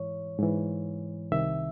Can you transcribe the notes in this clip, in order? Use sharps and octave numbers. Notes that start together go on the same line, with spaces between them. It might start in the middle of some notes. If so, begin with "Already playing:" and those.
Already playing: G#2 E3 C#5
G#2 E3
C2 C3 D#3 E5